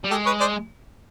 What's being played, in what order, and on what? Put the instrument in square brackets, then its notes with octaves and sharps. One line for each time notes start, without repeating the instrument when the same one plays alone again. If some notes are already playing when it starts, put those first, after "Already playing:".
[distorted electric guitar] G3
[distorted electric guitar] G#3 [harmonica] G4 A4
[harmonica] B4 C#5
C5 D5